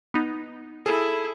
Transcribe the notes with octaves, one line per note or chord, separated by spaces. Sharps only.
B3 D#4
E4 G#4 A4